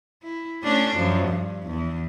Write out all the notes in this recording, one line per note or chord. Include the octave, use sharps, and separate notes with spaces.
E4
A3 C#4 D4
F#2 F3
G2
E2